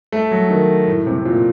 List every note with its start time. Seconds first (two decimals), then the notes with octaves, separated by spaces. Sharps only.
0.12 A3
0.31 F#3
0.50 D#3
0.87 A2
1.06 C3
1.25 A#2